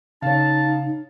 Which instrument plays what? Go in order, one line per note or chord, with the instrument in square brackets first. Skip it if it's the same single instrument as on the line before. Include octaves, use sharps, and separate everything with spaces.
[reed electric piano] C#3 [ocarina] D#4 [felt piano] C#5 F5 [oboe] A5